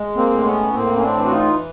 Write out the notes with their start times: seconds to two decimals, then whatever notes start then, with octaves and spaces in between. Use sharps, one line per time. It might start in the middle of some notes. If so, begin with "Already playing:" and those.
Already playing: G#3
0.16 A#3 C4
0.30 A2
0.45 B3 C#4
0.73 A2 A#3 C4
0.97 C#4
1.03 C4 D4
1.17 E3
1.25 F#4
1.31 D#4 F4